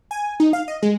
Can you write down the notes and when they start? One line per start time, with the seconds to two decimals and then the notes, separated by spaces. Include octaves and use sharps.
0.11 G#5
0.40 D#4
0.53 F5
0.68 D#5
0.82 G#3